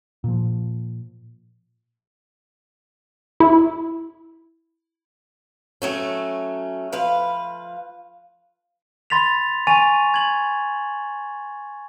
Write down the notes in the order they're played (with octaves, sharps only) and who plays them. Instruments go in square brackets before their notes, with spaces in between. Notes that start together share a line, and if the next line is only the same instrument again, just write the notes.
[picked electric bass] A#2 F3
[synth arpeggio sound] E4
[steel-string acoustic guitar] F#3 A3 C#4
F3 B4 F5
[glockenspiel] B5 C6 A6 B6 F7
G#5 C#6 A6 D#7 F7
G#6 F#7